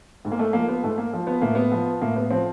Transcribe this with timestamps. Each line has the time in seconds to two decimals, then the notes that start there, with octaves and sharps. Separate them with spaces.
0.25 G#2
0.32 A#3
0.39 A3
0.53 F3 A#3
0.68 B3
0.83 G#2 A3
0.98 A#3
1.13 F3
1.27 B3
1.41 A2 A#3
1.55 B3
1.72 F3
2.02 A2 A#3
2.16 B3
2.31 F3 C4